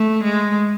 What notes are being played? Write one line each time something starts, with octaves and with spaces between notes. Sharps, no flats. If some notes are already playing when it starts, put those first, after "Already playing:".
Already playing: A3
G#3